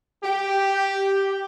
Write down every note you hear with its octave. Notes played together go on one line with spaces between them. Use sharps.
G4